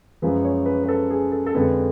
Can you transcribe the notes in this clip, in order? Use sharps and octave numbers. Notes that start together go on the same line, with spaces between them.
F#2 F3 G#3 B4
C#5
B4
B4
A4
G#4
A4
A4
F2 D3 G#3 B4